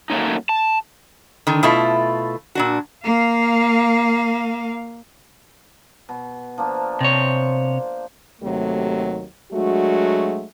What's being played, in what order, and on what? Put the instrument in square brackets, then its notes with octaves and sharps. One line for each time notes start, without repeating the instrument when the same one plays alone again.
[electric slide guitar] F#3 A3 A#3 C#4 D#4
A5
[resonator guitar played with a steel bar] D3 D#3
B2 A3 E4 F4
A#2 D4 F#4
[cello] A#3 F5
[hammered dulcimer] B2
F3 A#3 D4
[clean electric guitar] C3 C#5 [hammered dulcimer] C5
[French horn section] D#2 C3 F#3 A3
F#3 G#3 A3 D4 F#4